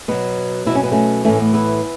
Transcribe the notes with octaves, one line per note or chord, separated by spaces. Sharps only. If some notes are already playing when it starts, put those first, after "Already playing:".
B2 F#3 B3
B2 F#3 E4
C#4
B3
A3 C#4
A2 E3 A3 C#4
B3
B3 E4